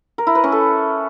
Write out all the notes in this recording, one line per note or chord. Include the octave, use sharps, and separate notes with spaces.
A#4
E4
B4
C#4
A4